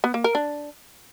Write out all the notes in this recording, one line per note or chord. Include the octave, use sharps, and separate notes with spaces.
B3
A#3
A#4
D4